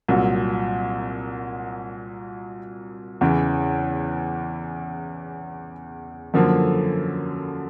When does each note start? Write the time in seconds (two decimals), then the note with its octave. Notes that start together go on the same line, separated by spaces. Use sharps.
0.08 C2 A#2 F#3
3.21 E2 C#3 E3
6.34 F#2 D3 F3 A#3